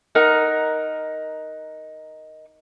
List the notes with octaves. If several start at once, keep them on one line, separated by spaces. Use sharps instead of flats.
D#4 A#4 F#5